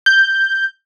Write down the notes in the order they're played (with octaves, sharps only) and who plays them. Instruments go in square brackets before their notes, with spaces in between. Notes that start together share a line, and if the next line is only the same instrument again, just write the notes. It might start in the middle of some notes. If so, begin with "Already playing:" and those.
[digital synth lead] G6